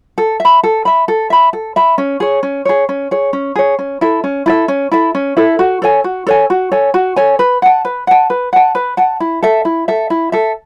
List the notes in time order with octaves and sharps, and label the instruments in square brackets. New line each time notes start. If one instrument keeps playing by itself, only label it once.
[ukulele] A4
E5
B5
A4
E5 B5
A4
E5 B5
A4
E5 B5
C#4
G#4 C#5
C#4
G#4 C#5
C#4
G#4 C#5
C#4
G#4 C#5
C#4
E4 A4 E5
C#4
E4 A4 E5
C#4
E4 A4 E5
C#4
E4 A4 E5
F#4
A4 C#5 G#5
F#4
A4 C#5 G#5
F#4
A4 C#5 G#5
F#4
A4 C#5 G#5
B4
F#5 A5
B4
F#5 A5
B4
F#5 A5
B4
F#5 A5
E4
A4 E5
E4
A4 E5
E4
A4 E5